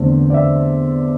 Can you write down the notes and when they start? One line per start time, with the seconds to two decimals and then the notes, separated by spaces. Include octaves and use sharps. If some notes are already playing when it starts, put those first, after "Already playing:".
Already playing: E2 D3 A3 C4
0.30 D5
0.34 E5